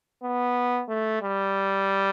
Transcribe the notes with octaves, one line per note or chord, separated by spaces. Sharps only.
B3
A3
G3